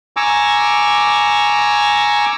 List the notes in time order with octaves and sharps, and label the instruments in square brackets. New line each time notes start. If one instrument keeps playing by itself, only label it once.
[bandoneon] G#5 A#5 C#6 D6 E6